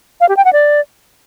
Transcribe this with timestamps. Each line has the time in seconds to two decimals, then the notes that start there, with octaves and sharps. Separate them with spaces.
0.21 F5
0.29 G4
0.37 G5
0.45 F#5
0.53 D5